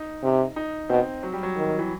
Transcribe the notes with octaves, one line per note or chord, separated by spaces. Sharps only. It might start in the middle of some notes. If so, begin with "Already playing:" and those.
Already playing: D#4
C3
D#4
B2 C4
F#3
G3
F#3
D#3
E3